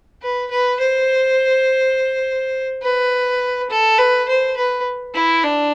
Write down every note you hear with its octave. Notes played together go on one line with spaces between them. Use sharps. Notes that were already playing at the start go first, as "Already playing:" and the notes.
B4
B4
C5
B4
A4
B4
C5
B4
E4
D4